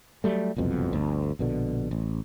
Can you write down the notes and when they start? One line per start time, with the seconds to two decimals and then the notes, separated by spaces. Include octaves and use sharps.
0.24 F#3 G3 A3
0.56 F#1 C2 F2 B2
0.93 G1 D2
1.39 A#1 B2 D3
1.91 A1